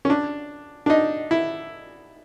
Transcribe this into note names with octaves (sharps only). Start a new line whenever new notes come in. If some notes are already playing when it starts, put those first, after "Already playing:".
C#4
D4
D4
D#4
E4